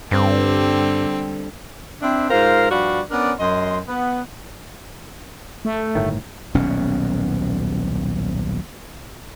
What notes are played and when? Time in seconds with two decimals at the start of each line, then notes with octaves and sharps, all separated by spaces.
0.11 G2 D3 G3 C4
2.02 C4 D4 E4
2.30 G#2 F4 A#4 C5 F5
2.71 G2 F3 F#4 D5 F5 B5
3.11 B3 C#4 D4 A#4 D5
3.39 F#2 D#5 C6
3.86 B3
5.65 A3
5.95 G1 A2 D#3
6.54 D#1 B1 B2 C#4